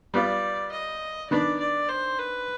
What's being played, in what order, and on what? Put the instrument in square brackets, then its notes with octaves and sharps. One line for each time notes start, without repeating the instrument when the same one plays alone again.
[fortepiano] G3 B3 F4 [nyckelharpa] D5
[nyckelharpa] D#5
[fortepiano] D#3 B3 D4 [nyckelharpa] D5
[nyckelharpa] D5
C5
B4